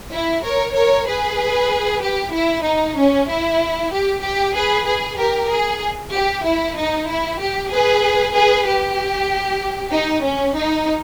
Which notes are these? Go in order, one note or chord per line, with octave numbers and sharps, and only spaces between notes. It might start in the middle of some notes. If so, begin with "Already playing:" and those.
E4
A#4 C#5
A#4 C#5
G#4 B4
G4
E4
D#4
C#4
E4
G4
G4
G#4 B4
G#4
G4 A#4
G#4
G4
E4
D#4
E4
G4
G#4 B4
G#4 B4
G4
D#4
C#4
D#4